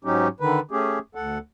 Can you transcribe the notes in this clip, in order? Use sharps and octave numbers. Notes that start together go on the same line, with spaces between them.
G#2 F#3 C#4 D#4 G4
D3 D#3 B4
A3 C#4 G4 G#4
D2 A4 F#5